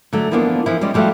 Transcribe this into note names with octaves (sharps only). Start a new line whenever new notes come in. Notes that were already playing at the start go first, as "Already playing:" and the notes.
D3 F#3 A3
E3 F3 A#3 B3 D4
E3 F3 E4
G3 G#3 C#4 D5 D#5
F3 G3 A3 F#4 E5 F5